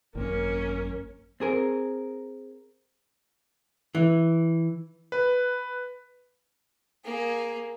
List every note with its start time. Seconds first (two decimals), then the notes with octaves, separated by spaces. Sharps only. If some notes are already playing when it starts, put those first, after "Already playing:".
0.15 G#1 F#2 A#3 C#4
1.40 C4 G#4 A#4
3.95 E3
5.12 B4
7.04 A#3 G#4